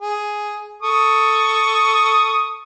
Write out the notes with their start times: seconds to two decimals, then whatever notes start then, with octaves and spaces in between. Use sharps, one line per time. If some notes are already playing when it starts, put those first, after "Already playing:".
0.01 G#4
0.82 A4 C#6 D#6